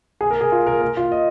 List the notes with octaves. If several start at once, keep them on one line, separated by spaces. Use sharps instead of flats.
G#4
A#4
G#4
F4
A#4
A#4
F4
D#5